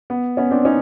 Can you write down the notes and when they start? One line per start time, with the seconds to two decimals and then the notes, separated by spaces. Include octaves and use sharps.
0.10 B3
0.37 B3 C#4
0.51 C4 D4
0.65 C#4 D#4